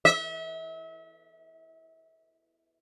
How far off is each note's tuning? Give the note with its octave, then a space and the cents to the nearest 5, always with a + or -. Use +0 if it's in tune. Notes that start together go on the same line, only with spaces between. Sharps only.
E5 -35